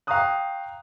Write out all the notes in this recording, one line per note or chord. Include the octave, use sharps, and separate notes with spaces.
F5 G5 A#5 C#6 D#6 F#6